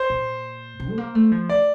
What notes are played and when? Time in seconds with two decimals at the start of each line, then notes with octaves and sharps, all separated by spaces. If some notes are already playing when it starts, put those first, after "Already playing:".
Already playing: C5
0.10 A#2
0.80 C3
0.89 A3
0.98 A#3
1.15 A3
1.31 F3
1.49 D5